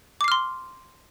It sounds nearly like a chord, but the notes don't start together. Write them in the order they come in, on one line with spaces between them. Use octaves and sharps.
D6 C7 F6 C6